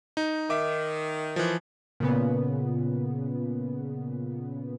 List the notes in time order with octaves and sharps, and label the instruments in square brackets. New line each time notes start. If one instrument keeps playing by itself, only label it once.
[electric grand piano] D#4
[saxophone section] D#3 [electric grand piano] E5 D6
[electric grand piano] E3 F3
[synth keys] A#2 C#3 B3